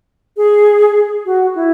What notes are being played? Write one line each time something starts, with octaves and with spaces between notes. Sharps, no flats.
G#4
F#4
E4